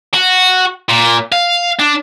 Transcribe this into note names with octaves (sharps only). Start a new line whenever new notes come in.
F#4
A#2
F5
D4